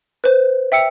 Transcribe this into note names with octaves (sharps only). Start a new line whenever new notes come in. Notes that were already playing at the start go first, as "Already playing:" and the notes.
B4 C5
E5 G5 E6 C#7